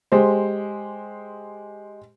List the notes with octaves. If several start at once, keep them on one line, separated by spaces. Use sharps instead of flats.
G#3 G4 C5